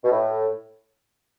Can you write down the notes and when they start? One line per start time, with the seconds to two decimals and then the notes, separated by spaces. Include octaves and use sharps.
0.04 B2
0.11 A2